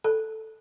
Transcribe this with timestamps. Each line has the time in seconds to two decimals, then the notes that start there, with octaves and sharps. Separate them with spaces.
0.04 A4